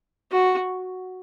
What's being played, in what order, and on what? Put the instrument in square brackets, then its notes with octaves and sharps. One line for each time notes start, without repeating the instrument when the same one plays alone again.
[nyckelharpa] F#4